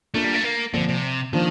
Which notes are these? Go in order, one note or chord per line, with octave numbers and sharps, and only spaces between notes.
A3 A#3 D4 F4
G3
A3
A#3
A#2 D3 F3 C4
C3
D#3 F3 A#3 D4 F4 C5